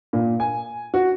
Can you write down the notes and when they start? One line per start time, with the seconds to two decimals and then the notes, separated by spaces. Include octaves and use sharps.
0.13 A#2
0.40 G#5
0.94 F#4